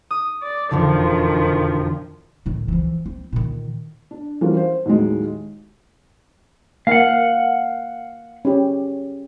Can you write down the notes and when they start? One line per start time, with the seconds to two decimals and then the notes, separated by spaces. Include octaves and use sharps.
0.11 D#6
0.42 D5
0.71 E1 F2 D3 D#3 F3
2.46 A2 D#3
2.68 E3 F3
3.06 C4
3.33 A#2 D#3
4.11 D4
4.41 E3 F3 G3 A#3 C#4 F#4
4.57 C5
4.86 D#2 A2 F#3 G#3
6.87 A#3 F5 F#5
8.45 C#4 G4